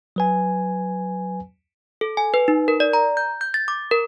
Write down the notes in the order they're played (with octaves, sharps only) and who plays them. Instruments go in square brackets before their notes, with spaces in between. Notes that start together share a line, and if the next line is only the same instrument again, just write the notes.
[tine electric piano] F#3 B4 G#5
[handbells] A4
G#5
B4
D#4
A#4
D5
A#5
G6
G6
A6
D6
A#4